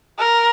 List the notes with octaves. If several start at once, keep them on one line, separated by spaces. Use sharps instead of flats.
A#4